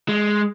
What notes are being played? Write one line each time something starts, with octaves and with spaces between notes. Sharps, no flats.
G#3